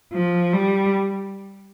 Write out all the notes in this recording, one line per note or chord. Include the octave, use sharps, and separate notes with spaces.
F3
G3